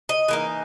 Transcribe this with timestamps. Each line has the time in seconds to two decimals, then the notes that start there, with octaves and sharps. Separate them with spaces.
0.09 D#5
0.28 E3 A#3 D#4